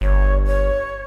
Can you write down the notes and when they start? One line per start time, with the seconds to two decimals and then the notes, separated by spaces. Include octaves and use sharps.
0.01 G1 C#5
0.47 C#5